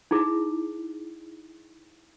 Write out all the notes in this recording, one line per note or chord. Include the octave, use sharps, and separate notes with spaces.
D#4 E4 G#4